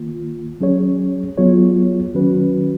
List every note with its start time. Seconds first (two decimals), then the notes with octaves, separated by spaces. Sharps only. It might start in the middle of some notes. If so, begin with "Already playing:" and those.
Already playing: D#3 A#3 F4
0.61 F#3 C#4 G#4 C#5
1.37 F#3 B3 F4 G#4 C#5
2.14 D#3 F#3 C#4 F#4 B4